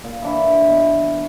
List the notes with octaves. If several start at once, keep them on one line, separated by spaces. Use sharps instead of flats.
A#2
E3 D4 E5
B2